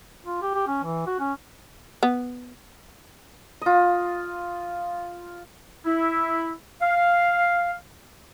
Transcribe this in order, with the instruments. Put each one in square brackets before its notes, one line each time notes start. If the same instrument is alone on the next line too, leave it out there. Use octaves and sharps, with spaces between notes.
[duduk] F4
G4
G4
C#4
E3
F#4
C#4
[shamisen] B3
[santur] F4 D#5
[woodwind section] E4
F5